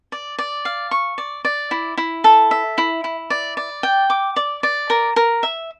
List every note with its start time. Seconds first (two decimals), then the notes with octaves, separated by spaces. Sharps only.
0.12 D5
0.39 D5
0.65 F5
0.91 C#6
1.18 D5
1.45 D5
1.71 E4
1.98 E4
2.24 A4
2.51 E5
2.78 E4
3.04 E4
3.30 D5
3.57 D5
3.83 G5
4.10 D6
4.36 D5
4.63 D5
4.90 A#4
5.16 A#4
5.43 E5